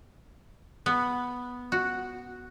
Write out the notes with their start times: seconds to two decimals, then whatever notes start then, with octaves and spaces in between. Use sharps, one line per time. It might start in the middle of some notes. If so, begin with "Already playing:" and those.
0.86 B3
1.72 F#4